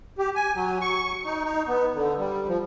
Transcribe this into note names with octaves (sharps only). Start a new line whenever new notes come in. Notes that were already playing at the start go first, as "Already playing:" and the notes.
G4
G#5
F#3
C#6
D#4
D#4
B3
D3
G3
F3